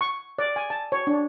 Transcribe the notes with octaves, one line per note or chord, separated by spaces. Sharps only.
C#6
D5
G#5
A5
C#5
D4